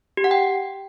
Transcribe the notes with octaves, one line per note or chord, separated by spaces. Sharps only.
G4
F#5
G5